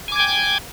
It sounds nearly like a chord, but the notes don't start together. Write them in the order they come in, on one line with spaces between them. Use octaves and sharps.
G#5 D6 G#6 G5